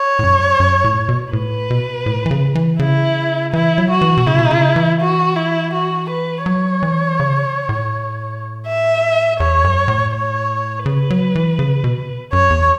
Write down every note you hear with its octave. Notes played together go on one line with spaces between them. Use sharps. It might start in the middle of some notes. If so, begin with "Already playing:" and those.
Already playing: C#5
A2
F#2
F#2
A2
B2
A2 B4
B2
A2
E3
C#3
E3
C#3 E4
E3 E4
F#3
F#4
E3
B2
C#3 E4
B2
C#3
E3
F#4
E4
F#4
B4
F#3 C#5
E3
C#3
A2
E5
E2 C#5
F#2
A2
C#5
C#3 B4
F#3
E3
C#3
B2
F#2 C#5
E2